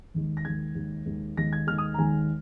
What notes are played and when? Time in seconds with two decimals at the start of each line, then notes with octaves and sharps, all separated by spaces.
0.14 D#2 D#3 G#3
0.37 A#6
0.45 D#2 D#3 G#3 G#6
0.75 D#2 D#3 G#3
1.06 D#2 D#3 G#3
1.37 D#2 D#3 G#3 A#6
1.53 G#6
1.67 D#2 D#3 G#3 F6
1.78 D#6
1.94 A#5
1.98 D#2 D#3 G#3 G#5